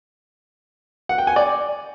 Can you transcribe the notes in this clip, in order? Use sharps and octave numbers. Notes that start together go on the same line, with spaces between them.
F#5
G5
G#5
D5